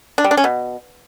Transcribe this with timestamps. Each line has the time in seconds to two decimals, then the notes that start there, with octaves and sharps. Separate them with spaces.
0.18 D4
0.24 G3
0.31 D4
0.37 C#4
0.44 B2